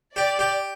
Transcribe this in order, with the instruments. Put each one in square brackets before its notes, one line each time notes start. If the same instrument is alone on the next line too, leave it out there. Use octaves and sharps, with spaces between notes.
[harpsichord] G4 [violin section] D5
[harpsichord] G4